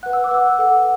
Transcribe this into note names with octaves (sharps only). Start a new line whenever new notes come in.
B4 F#5 F#6
E6
D6
B4 F#5 E6
A4 F#5